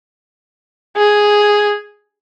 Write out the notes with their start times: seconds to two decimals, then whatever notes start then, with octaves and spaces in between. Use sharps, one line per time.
0.97 G#4